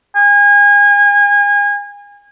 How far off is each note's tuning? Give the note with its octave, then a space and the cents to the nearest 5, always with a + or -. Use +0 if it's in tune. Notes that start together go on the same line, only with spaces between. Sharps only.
G#5 -30